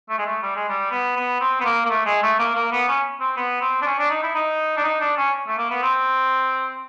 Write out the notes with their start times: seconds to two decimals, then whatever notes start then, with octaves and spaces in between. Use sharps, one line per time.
0.09 A3
0.18 G#3
0.26 A3
0.42 G3
0.55 G#3
0.69 G3
0.91 B3
1.16 B3
1.41 C4
1.61 B3
1.65 A#3
1.86 A#3
1.89 A3
2.06 G#3
2.22 A3
2.39 A#3
2.55 A#3
2.72 B3
2.88 C#4
3.20 C4
3.37 B3
3.61 C4
3.82 D4
3.86 C#4
3.98 D4
4.10 D#4
4.23 E4
4.35 D#4
4.77 D4
4.84 D#4
5.01 D4
5.17 C#4
5.47 A3
5.58 A#3
5.70 B3
5.82 C4